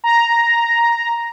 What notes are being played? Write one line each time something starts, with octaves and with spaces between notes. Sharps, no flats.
A#5